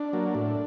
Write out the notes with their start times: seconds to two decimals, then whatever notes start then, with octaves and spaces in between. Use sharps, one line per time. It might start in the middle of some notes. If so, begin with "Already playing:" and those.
Already playing: D4
0.13 F#3 A#3
0.35 A2